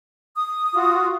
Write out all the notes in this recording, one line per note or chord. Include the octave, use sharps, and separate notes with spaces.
D#6
F4 F#4